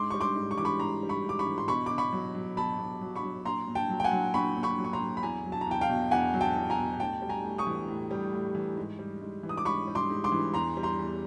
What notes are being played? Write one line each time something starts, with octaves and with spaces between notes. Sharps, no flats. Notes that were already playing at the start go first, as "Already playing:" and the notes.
Already playing: G#2 C6 D6
G3 C#6
C6 D6
G#2
C#6
E3 D6
B5 C#6
G#2 A#5 C6
G3
B5 C#6
G#2 D6
B5 C#6
E3
C6
B2 B5 C#6
B2 D6
B5 C#6
F#3
F#3
B2 A5 B5
B2
F#3
B5 C#6
F#3
A#2 A#5 C6
A#2
G5 A5
F#3
G5
F#5 G#5
F#3
A#2 B5 C#6
A#2
B5 C#6
F#3
C#6
A#5 C6
F#3
B5
E2 G#5 A#5
F#3
A5
A#5
E2 G5 A5
F5 G5
B2
E2 F#5 G#5
F#3
G5 A5
E2
G#5 A#5
B2
A2 G5 A5
G3
G#5 A#5
A2
C#6 D#6
E3
A2
G3
A2
E3
G#2
G3
G#2
E3
D#6
D6
G#2 B5 C#6
G3
C6 D6
G#2
C6 D6
E3
E2 A#5 C6
G3
A#5 C6
E2